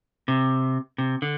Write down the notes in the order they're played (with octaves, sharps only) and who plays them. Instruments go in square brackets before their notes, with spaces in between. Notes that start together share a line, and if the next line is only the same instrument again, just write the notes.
[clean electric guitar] C3
C3
D3